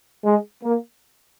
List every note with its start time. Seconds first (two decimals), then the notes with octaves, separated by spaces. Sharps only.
0.24 G#3
0.63 A#3